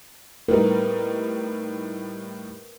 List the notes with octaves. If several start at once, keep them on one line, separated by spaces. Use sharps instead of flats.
A2 G3 D#4 A#4 B4